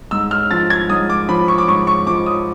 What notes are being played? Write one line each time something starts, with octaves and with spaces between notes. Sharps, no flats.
G#2 E6
F6
F3 A6
G#6
G#2 D#6
D6
F3 B5
C#6
D6
G#2 C#6
C#6
F3 D6
D#6